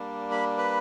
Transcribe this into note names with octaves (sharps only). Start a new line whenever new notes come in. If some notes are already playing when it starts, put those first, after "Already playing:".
Already playing: G3 A#3 D4
B5
B4 B5